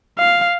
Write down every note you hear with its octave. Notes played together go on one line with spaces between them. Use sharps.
F5